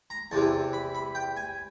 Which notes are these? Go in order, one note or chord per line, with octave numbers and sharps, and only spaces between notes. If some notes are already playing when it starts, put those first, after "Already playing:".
A#5
E2 C3 E3 A5
B5
B5
G5
G#5